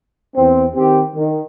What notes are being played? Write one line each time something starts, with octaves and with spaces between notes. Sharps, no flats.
E2 C4
D#3 C4 G4
D#3